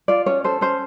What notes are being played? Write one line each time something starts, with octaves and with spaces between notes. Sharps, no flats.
F4 D5
C#4 C#5
A4 C5
C#4 C5